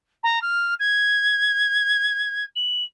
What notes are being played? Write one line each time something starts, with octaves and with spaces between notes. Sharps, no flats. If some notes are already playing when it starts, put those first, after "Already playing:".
A#5
F6
G#6
F#7